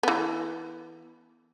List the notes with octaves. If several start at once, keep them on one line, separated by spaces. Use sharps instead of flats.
E3 B3